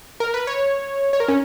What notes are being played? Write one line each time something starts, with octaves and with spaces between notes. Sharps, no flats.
A#4
B4
C#5
C#5
A#4
C#4